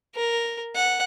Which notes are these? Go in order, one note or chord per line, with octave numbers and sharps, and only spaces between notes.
A#4
F#5